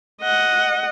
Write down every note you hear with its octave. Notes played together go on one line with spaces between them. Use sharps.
D#5 F#5